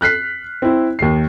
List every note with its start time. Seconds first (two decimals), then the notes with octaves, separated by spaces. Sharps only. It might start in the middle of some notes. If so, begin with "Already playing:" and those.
0.01 F6 F#6 B6 C7
0.62 C4 E4
0.99 D#2 C7